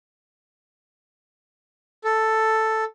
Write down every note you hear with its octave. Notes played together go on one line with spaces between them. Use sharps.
A4